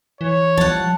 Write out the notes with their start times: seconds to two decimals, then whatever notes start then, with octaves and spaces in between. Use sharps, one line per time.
0.21 E3 C#5
0.57 F3 G3 F#5 A5